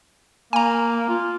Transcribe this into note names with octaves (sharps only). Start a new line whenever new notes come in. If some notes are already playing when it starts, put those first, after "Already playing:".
A#3 G#5 A#5
F4